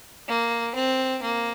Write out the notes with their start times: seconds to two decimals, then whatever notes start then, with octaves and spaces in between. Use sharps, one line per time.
0.28 A#3
0.75 C4
1.22 A#3